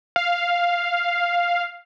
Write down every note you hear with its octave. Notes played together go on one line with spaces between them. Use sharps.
F5